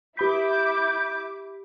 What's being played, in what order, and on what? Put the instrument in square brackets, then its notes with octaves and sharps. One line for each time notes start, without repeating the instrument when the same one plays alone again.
[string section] E4 D6 [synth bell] G4 B5 B6 [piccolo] G6